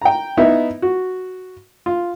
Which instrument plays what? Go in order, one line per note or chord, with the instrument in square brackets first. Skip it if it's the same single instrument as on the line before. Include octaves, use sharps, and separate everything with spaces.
[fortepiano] G5 A#5
B3 D#4 E4 E5
F#4
F4